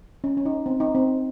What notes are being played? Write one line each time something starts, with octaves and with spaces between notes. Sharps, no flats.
C#4
C#4
D#4
C4
D#4
C4